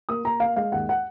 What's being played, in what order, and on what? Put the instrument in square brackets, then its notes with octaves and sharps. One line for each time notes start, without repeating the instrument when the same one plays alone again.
[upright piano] A#3 D#6
A#3 A#5
A#3 F5
G#3 F5
D#2 F#5
F#5